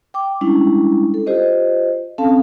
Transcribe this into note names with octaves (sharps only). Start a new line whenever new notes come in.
G5 D6
G3 G#3 C#4 D4 E4
A4
F4 G4 C5 D#5
C4 C#4 A4 F5 A5